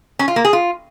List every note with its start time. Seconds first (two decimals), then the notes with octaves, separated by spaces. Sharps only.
0.19 C#4
0.28 F4
0.36 A#3
0.45 G#4
0.53 F4